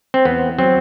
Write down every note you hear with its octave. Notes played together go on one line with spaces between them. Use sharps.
C4
E2 B3
F#3 C4